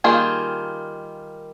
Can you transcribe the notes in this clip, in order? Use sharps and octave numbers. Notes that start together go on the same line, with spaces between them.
D#3 G3 A#3 F4 G#4